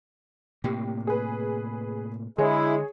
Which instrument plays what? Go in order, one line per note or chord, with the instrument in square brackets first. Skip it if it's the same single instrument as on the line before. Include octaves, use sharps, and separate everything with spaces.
[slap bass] A2 C3 A#3 [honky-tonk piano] G4
[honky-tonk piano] G#4 B4
[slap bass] D3 [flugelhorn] G#3 [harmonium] E4 [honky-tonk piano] G#4 C#5